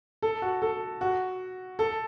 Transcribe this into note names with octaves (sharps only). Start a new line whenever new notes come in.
A4
F#4
A4
F#4
A4